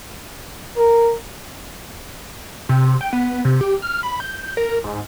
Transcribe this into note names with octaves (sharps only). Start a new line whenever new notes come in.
A#4
C3
G5
B3
C3
G4
F6
B5
G6
A#4
G#2